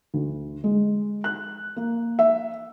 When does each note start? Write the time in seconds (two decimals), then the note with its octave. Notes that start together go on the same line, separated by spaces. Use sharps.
0.14 D2
0.64 G#3
1.24 F#6
1.76 A#3
2.19 E5